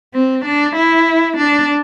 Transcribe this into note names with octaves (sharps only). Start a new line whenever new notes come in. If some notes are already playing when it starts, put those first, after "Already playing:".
C4
D4
E4
D4